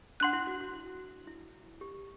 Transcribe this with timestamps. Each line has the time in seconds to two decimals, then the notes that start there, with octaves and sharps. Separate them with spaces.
0.20 D4 F#5 C6 F#6
0.33 E4
0.47 F#4
0.61 F#4
0.73 F#4
1.27 E4
1.81 G4